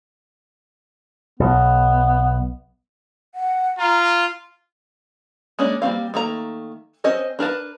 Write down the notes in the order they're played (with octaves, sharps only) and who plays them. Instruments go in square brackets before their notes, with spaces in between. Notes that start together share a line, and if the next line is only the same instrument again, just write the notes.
[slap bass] B1 [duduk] B3
[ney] F#5
[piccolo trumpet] F4 [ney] A#5
[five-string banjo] G#3 A#3 C#4 D4
G3 A#3 C4 F5
D#3 A3 A#3 A#5
C4 C#4 C5 D#5
D4 A#4 B4 A5